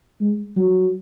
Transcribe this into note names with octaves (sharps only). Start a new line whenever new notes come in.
G#3
F#3